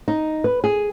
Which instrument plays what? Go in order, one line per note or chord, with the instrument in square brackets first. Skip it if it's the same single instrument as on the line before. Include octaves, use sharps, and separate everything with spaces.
[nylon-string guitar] D#4
B4
G#4